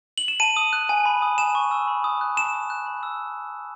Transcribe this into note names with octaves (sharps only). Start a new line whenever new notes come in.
F#7
E7
A5 D#7
D#6
F#6
G#5
B5
D#6
G#5 E7
C#6
E6
B5
D#6
F#6
A5 E7
D#6
F#6
B5
E6